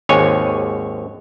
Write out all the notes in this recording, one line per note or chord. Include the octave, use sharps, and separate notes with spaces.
G#1 D#2 C#5 G#5